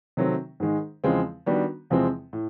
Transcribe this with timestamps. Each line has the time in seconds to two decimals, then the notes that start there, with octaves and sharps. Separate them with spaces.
0.17 C3 D#3 F#3 A3 C4
0.60 G#2 D#3 G#3
1.04 E2 C#3 F3 G#3 C4
1.46 D#3 G3 B3 D4 F#4
1.90 E2 C3 F3 G#3 C4
2.33 A2